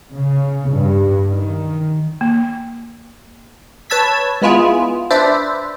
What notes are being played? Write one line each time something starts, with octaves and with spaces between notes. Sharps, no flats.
C#3
G2
D#3
A#3
B4 C#5 A5 E6 G#6 B6
G#3 B3 E4 F4 G#4
D4 B4 C5 D5 E5